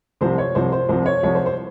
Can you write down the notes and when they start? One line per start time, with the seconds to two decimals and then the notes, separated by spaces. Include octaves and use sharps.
0.21 C2 C3 F3 C5
0.38 C#5
0.55 C2 C3 F3 C5
0.72 C5
0.89 C2 C3 F3 C5
1.06 C#5
1.23 C2 C3 F3 C#5
1.35 C5
1.46 C5